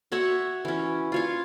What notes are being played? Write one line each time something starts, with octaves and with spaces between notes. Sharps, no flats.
F#4 C#5 E5 F#5
E3 C#4
F4 C#5 F5